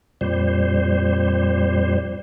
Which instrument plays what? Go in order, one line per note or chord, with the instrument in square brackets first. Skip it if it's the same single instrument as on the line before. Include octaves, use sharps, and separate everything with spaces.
[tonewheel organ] F2 A#2 G3 C5